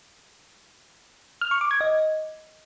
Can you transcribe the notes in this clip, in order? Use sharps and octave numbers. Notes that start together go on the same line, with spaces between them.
F6
C#6
D6
G#6
D#5